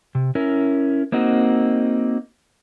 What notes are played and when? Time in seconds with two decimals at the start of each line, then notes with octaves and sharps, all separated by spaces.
0.15 C3
0.35 C#4 E4 A#4
1.12 A#3 C4 D#4 F#4